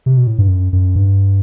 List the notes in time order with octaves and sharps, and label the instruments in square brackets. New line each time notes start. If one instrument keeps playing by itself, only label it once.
[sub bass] C3
B2
A2
G2
F#2
F#2
G2